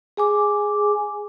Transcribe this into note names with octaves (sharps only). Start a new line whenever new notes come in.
G#4 G#5 D6